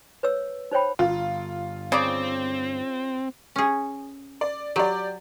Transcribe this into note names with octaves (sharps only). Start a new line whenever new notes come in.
B4 C#5 E6
D#4 C5 C#5 G5 B5
G1 F4
C#3 C4 D5
C#4 G#4
D5
F#3 G4 D5